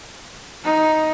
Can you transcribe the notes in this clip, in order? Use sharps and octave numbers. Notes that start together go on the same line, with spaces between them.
D#4